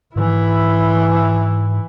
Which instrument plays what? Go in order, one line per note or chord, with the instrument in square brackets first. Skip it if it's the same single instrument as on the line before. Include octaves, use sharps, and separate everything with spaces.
[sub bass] G#2 [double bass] E3 E4